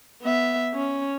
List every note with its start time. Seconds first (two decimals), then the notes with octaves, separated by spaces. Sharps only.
0.22 B3 E5
0.74 C#4